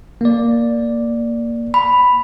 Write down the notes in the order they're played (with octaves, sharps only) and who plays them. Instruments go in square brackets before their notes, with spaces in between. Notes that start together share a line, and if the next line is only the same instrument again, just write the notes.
[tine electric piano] A#3 D5
[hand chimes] B5